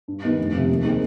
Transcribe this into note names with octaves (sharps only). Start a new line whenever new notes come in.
G2
D#3 B3 D#4
F1
F2 C3
D#2
D#3 G#3 C4